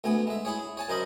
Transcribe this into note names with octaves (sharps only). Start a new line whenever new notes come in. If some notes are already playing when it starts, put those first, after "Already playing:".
D2 A3 B3 G#5
G#3 E5
E4 G#4 C#5
C#5 G#5 A5
F#2 A#4 C5 D#5 B5